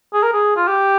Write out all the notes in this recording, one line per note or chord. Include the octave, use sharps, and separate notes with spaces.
G#4
A#4
G#4
F4
G4